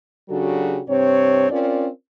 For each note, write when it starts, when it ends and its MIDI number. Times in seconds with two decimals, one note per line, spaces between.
0.29 0.80 49
0.29 0.80 54
0.29 0.80 62
0.29 0.80 66
0.29 0.80 67
0.29 0.80 69
0.88 1.49 43
0.88 1.49 48
0.88 1.49 60
0.88 1.49 73
1.50 1.87 60
1.50 1.87 61
1.50 1.87 65
1.50 1.87 70
1.50 1.87 74